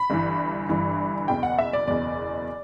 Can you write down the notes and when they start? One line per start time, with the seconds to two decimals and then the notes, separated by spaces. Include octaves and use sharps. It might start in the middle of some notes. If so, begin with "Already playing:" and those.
Already playing: B5
0.10 G1 G2 E3
0.69 G1 G2 E3
1.28 F#1 E2 B2 G5
1.43 F#5
1.58 E5
1.73 D5
1.88 F#1 E2 B2 D5